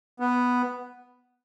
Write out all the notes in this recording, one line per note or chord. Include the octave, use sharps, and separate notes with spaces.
B3